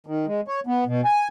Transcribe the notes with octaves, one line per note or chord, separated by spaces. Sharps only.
D#3
G#3
C#5
B3
B2
G#5